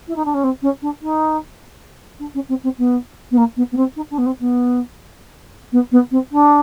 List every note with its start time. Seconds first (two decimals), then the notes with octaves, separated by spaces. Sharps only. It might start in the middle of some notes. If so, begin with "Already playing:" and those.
0.07 E4
0.15 D#4
0.25 D4
0.34 C#4
0.43 C4
0.62 C#4
0.82 D4
1.01 D#4
2.19 D4
2.34 C#4
2.48 C4
2.63 C4
2.78 B3
3.31 B3
3.37 A#3
3.56 B3
3.71 B3
3.76 C4
3.95 D#4
4.10 D4
4.18 B3
4.26 C4
4.40 B3
5.72 B3
5.91 B3
6.11 C4
6.31 D4